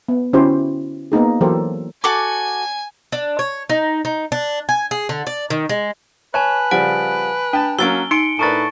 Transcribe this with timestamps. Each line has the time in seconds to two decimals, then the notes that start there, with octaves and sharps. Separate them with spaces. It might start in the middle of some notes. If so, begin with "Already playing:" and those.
0.09 B3
0.33 D3 C#4 E4 F#4 G4 C5
1.12 A#3 B3 D#4 G#4
1.41 E3 F#3 G4 A4 A#4 C5
2.04 F#4 A4 G#5 D6
3.12 D4
3.39 C#5
3.69 D#4
4.05 D#4
4.32 D4
4.69 G#5
4.91 G#4
5.09 D3
5.27 D5
5.50 D#3
5.69 G#3
6.34 B4 C#5 G#5 A5 F#6
6.71 C#3 F3 G3 F#5 D7
7.53 D4 G5 A5
7.79 F#3 A#3 C#4 E6 A6 D7 G7
8.11 D#4 C6 C#7 D7
8.39 A2 D4 A#4 B4 A5 C#6 A6